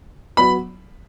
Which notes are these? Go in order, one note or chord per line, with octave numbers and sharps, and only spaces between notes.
F#3 B3 B5